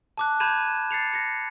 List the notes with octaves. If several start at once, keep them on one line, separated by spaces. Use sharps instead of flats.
A5 D6 F#6
B5 G6 G#6 D#7 E7
A6 C7 C#7 F7
A#6 C#7